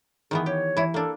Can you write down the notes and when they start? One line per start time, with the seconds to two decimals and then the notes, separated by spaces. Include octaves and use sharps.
0.31 D#3 E3 B3 G#4
0.46 G4 C#5
0.77 E3 E4
0.94 A#3 D4 A4